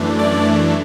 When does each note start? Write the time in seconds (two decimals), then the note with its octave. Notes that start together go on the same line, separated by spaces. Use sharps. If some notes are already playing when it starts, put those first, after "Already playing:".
Already playing: F#2 E3 A3 D4
0.19 D5